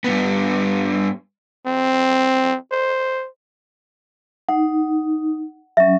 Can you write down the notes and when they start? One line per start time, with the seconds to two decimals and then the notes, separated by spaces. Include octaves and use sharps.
0.04 G2 B3
1.67 C4
2.72 C5
4.49 D#4 F#5
5.77 F#3 C#4 E5